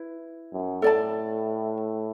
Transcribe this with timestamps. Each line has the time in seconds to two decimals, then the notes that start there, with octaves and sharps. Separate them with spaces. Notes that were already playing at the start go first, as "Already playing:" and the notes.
Already playing: E4 B4
0.53 F#2
0.82 A2 A4 D5 A5